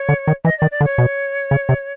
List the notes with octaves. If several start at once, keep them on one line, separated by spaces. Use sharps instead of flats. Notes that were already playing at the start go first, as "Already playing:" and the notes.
Already playing: C#5
D3
D#3
E3 D#5
D#3 D5
D5
D3
C#5
B2
C#3
C3